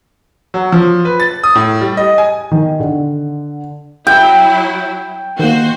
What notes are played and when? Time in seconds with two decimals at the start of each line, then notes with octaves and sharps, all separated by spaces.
0.54 F#3
0.72 F3
1.05 B4
1.20 A6
1.44 D#6
1.55 A2
1.81 G3
1.97 D#5
2.18 G#5
2.51 D#3
2.80 D3
4.07 F#3 E4 G5
5.39 D#3 A#3 F#4 C5